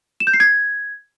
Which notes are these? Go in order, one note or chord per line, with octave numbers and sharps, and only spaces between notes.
E7
G6
C7
G#6